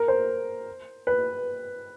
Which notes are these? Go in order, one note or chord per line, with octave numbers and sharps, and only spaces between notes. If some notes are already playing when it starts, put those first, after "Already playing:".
Already playing: A#4
C5
B4